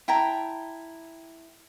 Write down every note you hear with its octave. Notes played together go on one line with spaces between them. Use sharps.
E4 G5 A5 A#5